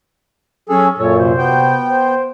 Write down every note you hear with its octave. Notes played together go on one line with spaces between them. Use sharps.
F#3 C#4 G#4 A4
F#2 A#2 A4 C#5
C3 F#4 C5
B3 G5
C5